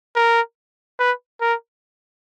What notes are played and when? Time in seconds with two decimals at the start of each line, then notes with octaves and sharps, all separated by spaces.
0.16 A#4
0.99 B4
1.41 A#4